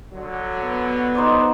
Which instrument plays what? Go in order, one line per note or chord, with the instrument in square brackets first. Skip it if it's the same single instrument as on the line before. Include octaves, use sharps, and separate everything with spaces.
[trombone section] D3 F#3
[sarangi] B3
[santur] D#4 C5 D5